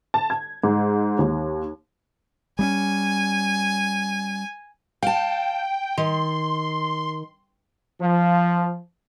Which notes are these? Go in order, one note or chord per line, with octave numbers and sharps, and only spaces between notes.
A5
G#6
G#2
D#2
G3 B3 C#4 G#5
F5 G5 A5
D#3 C6
F3